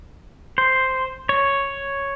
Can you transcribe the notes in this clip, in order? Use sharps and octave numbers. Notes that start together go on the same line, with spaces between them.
C5
C#5